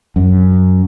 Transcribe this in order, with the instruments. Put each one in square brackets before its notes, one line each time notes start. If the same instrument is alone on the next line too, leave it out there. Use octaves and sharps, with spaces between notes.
[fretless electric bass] F#2